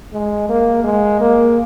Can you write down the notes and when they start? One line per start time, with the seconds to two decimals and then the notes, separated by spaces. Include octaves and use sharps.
0.13 G#3
0.49 A#3
0.84 G#3
1.20 A#3